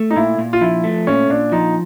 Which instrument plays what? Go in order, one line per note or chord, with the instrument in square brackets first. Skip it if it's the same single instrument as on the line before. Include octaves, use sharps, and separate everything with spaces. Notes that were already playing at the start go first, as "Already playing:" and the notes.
Already playing: [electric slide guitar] A3
[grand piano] D#4
[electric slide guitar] A#2 [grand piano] E4
[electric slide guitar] A#2
[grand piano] F4
[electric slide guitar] F3 [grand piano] E4
[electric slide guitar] A3
[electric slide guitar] A#2 [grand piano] C#4
[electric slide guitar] A#2 [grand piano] D4
[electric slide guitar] F3 [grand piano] D#4